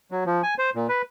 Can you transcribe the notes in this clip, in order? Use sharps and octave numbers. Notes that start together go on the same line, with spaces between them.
F#3
F3
G#5
C5
A#2
B4